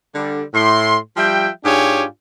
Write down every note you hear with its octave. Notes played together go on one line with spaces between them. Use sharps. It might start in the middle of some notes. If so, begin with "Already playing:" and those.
D3 G3
A2 C6
F3 G3 E5 G5
G#2 D4 F4 G4 C#5 G#5